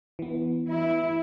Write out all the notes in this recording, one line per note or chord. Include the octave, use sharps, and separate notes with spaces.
E3 B3
E4